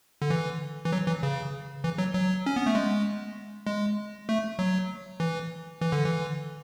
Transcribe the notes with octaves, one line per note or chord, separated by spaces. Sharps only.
D3
E3
E3
F#3
E3
C#3
E3
F#3
F#3
C#4
B3
A3
G#3
G#3
A3
F#3
E3
E3
D3
E3